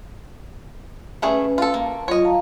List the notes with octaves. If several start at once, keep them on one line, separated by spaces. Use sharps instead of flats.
G3 A3 C#4 G#4 B4
F4 A4
A#3 A5
F#3 F4 C#5 D#5
F5 A5 A#5